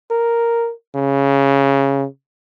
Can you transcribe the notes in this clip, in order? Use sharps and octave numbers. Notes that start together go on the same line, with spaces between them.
A#4
C#3